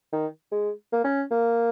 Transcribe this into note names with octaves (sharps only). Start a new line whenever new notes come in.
D#3
G#3
A#3
C#4
A#3